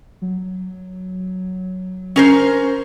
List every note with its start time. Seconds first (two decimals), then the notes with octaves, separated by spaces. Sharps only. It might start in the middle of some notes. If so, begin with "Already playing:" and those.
0.22 F#3
2.16 C#4 A#4 C5